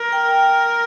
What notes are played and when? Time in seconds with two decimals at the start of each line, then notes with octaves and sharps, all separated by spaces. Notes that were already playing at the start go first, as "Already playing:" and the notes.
Already playing: A#4
0.12 G5